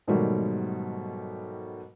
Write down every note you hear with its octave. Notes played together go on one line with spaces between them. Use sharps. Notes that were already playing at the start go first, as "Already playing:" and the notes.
G#2 B2 D#3 F#3 G3 A3